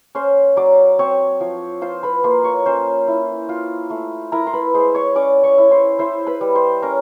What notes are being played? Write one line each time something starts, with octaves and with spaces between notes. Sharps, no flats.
C#4 C5 C6
F#3 D5 D6
C4 C#5 C#6
F3
F4 C5 C6
B4 B5
A#3 C5 C6
C#5 C#6
C#4 C5 C6
E4
F4
A3
E4 A#4 A#5
C6
B4 B5
G#3 C5 C6
C#5 C#6
C#4 D5 D6
C#5 C#6
E4
C5 C6
E4 C5 C6
B4 B5
G3
C5 C6
C#4 A#4 A#5